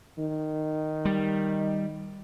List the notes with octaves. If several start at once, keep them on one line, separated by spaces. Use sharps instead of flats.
D#3
G3